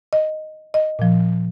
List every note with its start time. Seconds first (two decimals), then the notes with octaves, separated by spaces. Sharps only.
0.13 D#5
0.74 D#5
0.99 A#2 F3